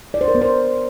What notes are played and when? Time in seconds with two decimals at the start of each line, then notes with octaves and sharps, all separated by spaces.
0.14 D5
0.21 C5
0.28 A#4
0.35 B3
0.42 C5